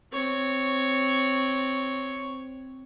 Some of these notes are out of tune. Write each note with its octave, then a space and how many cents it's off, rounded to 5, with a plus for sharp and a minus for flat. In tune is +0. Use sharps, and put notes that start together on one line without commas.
C4 +0 C#5 +0